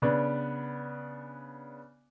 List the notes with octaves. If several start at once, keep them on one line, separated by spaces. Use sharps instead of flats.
C#3 B3 D4